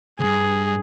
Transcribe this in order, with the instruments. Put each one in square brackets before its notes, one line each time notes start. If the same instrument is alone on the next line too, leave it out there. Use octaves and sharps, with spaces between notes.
[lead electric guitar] D2 G2 [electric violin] G#4